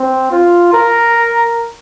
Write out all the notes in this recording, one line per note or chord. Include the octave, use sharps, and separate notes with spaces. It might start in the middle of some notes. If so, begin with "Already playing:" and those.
Already playing: C4
F4
A#4